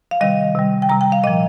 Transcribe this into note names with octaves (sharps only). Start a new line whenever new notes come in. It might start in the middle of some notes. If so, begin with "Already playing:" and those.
F5
C3 D#3 G3 D#5
C3 G3
G5
C3 G3 A#5
G5
F5
A#2 F3 D#5